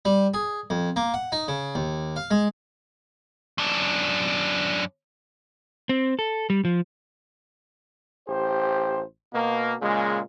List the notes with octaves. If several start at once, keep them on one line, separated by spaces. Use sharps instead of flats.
G3
G#4
F2
A#3
F#5
D#4
C#3
D#2
F5
G#3
F#2 D4
C4
A4
G3
F3
A1 G4 C5
B2 A#3
A#2 C#3 G#3